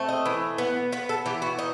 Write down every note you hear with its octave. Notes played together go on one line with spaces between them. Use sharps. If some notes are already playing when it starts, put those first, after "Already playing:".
Already playing: A3 C4
D#5
E3
B3
B3 B4
A4
E3 G4
F#4
D#4